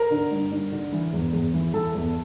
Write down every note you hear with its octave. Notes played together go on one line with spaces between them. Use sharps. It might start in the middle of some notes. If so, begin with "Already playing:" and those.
Already playing: A#4
D3
G2
G2
D3
E3
E2
E2
E3
E3 A4
E2